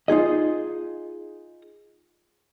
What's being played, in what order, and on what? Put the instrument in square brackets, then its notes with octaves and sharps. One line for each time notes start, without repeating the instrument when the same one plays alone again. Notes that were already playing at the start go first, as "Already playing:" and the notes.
[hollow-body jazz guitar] D#4 F4 G#4 D#5